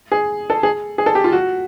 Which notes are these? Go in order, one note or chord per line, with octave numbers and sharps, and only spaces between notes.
G#4
A4
G#4
G#4
A4
G4
F4
F#4